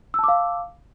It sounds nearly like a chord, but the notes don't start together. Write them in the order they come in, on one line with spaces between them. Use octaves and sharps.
E6 A5 D6 F5